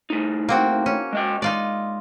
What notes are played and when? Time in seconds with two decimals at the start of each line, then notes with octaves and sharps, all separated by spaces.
0.10 A2 D#4
0.49 A#3 C4 F#4
0.86 C#4
1.13 G#3 D#5 G5
1.42 G#3 D#4 F4 D5